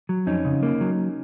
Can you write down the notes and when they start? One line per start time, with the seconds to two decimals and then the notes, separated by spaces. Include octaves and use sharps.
0.09 F#3
0.27 F2 C#4 D#4
0.45 C#3
0.63 A#3
0.81 F#3